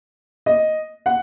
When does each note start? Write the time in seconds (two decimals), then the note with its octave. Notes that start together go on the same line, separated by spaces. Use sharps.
0.46 D#5
1.06 F#5